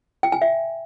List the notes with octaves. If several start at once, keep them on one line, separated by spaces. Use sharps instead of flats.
G5
G#5
E5